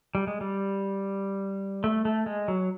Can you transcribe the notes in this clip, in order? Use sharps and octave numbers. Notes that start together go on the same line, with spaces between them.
G3
G#3
G3
A3
A3
G#3
F#3